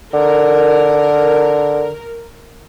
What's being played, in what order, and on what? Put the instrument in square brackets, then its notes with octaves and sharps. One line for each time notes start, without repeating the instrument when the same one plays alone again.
[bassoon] D3 [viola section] A#4